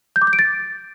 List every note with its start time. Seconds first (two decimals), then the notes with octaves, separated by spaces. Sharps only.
0.16 G6
0.22 D6
0.27 G6
0.33 D7
0.39 A6